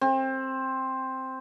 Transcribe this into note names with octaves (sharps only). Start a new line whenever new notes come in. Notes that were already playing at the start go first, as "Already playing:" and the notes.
C4